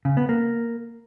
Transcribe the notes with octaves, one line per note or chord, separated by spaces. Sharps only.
C#3
B3
A#3